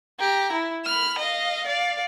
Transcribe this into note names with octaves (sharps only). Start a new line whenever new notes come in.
G4 A#5
E4
B5 F6
D#5 F5
D5 F5